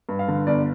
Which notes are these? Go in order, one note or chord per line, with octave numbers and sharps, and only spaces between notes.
G2
F5
D3
G1 D5